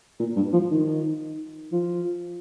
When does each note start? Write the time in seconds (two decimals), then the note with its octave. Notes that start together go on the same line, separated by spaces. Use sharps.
0.19 A#2
0.36 G2
0.53 F3
0.71 D#3
1.72 F3